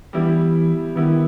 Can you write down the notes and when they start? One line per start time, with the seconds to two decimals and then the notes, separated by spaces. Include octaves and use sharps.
0.13 E3 G3 B3 E4 G4
0.95 D#3 G3 B3 E4 G4